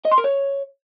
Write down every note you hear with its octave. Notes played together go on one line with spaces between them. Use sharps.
D#5
C6
A#4
C#5